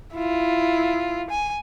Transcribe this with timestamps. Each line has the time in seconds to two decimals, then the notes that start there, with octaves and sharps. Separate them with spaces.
0.14 E4 F4
1.30 G#5